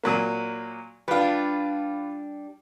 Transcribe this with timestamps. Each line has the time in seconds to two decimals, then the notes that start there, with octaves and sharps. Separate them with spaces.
0.03 A#2 F#3 A#3
1.08 G3 D4 F4 B4